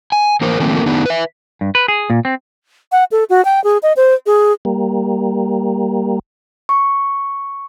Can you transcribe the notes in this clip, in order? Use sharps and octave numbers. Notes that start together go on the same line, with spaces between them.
G#5
E3 A#3 A#4 C5
D#3 F3 A3 A#3 C4
D#3 B3 D4 D#4
B4 E5
G2
B4
G#4
A#2
C4
F#5
A4
F#4
G5
G#4
D#5
C5
G#4
G3 A#3
C#6